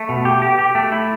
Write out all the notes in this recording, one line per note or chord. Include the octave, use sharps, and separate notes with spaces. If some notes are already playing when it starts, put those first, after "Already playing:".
Already playing: A3
B2
G4
G4
G4
A3
E4